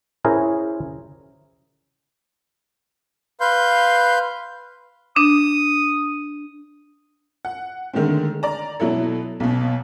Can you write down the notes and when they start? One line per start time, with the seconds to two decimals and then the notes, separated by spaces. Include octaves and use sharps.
0.25 C#4 E4 G#4 A#4 C5
3.41 B4 F5 C6 G6
5.16 D4 D#6
7.45 F#5
7.93 D3 D#3 G#3 A3 C4
8.43 D5 A#5
8.80 B2 F#3 E4 A4
9.40 B1 B2